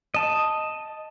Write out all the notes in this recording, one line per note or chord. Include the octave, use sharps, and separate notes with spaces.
D#5 A5